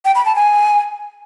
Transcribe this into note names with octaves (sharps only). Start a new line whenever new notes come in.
G5
B5
A5
G#5